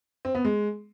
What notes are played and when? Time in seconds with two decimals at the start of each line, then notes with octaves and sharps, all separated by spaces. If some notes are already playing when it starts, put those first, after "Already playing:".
0.25 C4
0.35 B3
0.45 G#3